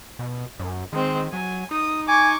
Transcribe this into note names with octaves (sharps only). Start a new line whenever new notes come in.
B2
F#2
D#3 G#3 C4
F#3 G#5
D#4 D#6
G#5 C#6 D6